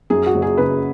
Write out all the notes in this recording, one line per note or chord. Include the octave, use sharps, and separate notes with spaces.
F#2 G#4
F#4
F#1
G#4
C#3 B4